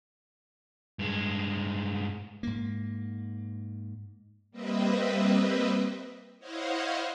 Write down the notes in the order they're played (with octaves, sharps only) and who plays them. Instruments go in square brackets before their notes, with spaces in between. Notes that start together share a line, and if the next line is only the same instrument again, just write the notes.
[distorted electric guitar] G2 G#3
[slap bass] G#2 A#3
[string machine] G3 A#3 C4 B4 D#5 E5
E4 C5 C#5 D#5 F5 F#5